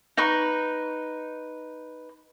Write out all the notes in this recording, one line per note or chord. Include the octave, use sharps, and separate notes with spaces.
D#4 B4 C#6